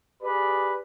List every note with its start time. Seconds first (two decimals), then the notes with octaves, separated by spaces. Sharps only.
0.22 G4 G#4 B4 D5